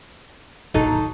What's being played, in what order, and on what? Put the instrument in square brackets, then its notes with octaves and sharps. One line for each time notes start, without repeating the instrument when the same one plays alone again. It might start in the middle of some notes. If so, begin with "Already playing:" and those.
[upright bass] A1 A#2 [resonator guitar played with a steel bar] F#3 D#4 A4
[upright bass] A2 D#3